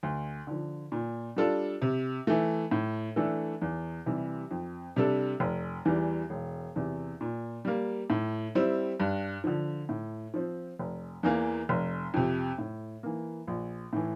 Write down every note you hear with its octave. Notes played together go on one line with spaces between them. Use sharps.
D2
D3 F3
A#2
G3 D4 F4 A4
C3
E3 A3
A2
E3 A3 D4 A4
E2
C3 E3 G3
F2
C3 G3 D4 A4
F1
E2 E3 G3
E1
E2 C3
A#2
G3 A#3
A2
G3 C4 E4
G2
D3 F3
A2
F3 C4
F1
E2 E3 A#3
F1
F2 C3
A2
E3 A#3
A#1
A2 E3